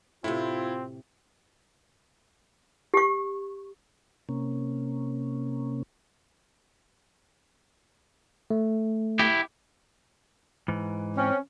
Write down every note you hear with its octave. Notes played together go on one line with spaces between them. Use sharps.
A2 C3 C4 E4 F4
G4 C#6
C3 A#3 C#4
A3
E4 G4
G#2 E3
C4 C#4